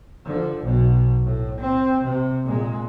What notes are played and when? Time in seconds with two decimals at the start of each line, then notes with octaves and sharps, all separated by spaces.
0.25 D3 F3
0.62 B1 B2
1.25 A2
1.61 C4
2.04 C3
2.45 A#2 G#3